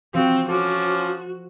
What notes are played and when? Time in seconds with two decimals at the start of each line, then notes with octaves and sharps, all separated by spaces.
0.14 F3 C4 F#4
0.49 F3 C#4 F#4 A4 D6